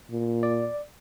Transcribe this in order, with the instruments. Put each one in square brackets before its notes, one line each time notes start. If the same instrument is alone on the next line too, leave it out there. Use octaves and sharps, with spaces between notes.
[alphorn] A#2
[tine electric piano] D5